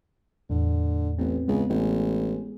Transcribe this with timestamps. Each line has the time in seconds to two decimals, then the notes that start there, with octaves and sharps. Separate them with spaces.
0.50 E2 A2 D3
1.18 A1 B3 C4
1.48 C#2 G#3 B3 G#4
1.70 A1